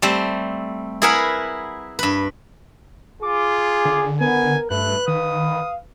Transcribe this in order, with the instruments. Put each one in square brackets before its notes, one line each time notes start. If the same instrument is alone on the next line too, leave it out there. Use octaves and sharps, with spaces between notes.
[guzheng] G3 A3 C4
E4 G#4 A#4 B4 F#5 G#5
G2 B4
[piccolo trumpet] F4 [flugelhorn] G#4 [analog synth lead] D6
[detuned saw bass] D3
[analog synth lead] B3 [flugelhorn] A#4 [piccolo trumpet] G#5
[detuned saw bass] G2 [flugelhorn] A3 [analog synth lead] B4 [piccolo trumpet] F#6
[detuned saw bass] D#3 [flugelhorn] F5 [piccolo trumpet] D#6